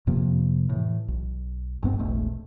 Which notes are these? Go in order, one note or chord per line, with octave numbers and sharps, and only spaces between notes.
F2 C3 F3 A#3
A2 E3
B1
F#1 G2 B3 C4
E1 A#1 A3